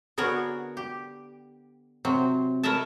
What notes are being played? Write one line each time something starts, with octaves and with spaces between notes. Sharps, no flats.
D3 B3 F#4 G#4 A#4 C#5
G4
C3 F#3 C4
A#4 B4 C#5 D#5 E5 A5